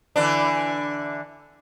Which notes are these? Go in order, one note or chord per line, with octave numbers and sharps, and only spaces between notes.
D3 E3 D4